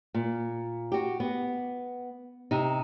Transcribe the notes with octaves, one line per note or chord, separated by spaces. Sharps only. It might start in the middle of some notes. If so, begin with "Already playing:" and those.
A#2
F#4 G4
B3
C3 D#4